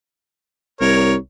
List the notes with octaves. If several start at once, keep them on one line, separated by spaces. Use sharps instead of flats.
C2 A#4 C#5